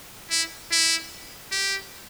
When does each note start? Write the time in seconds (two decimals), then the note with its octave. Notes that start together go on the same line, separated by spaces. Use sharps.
0.31 E4
0.72 E4
1.52 G4